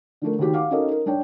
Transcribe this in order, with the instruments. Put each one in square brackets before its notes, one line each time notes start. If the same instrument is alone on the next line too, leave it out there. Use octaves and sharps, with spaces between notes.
[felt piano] D3 F3 A3 A#4
D#2 D#3 F#4 G4
F5 F#5 D6
C#4 D#4 F#4 A4 A#4 D#5
A#4
G2 D4 C#5 G5